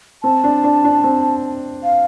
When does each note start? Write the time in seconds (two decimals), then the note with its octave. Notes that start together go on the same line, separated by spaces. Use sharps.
0.23 C4 A5
0.44 D4
0.64 D4
0.84 D4
1.04 C4
1.84 F5